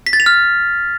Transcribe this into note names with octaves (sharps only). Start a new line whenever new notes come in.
B6
A6
F7
F6